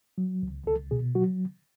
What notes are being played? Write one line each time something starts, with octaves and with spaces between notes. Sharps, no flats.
F#3
C#2
C#2 A4
B2 G#4
F#3 F#4